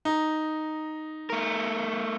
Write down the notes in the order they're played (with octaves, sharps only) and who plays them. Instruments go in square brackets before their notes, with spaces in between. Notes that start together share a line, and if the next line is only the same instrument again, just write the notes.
[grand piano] D#4
[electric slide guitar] A3 A#4